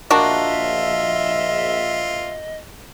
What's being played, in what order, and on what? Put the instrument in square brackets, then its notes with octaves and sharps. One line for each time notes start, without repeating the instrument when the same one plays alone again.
[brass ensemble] A#1 E5 [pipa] A#3 D4 F#4 [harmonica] F4 [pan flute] D#5